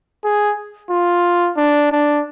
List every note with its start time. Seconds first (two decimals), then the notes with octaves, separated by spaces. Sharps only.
0.24 G#4
0.90 F4
1.57 D4
1.92 D4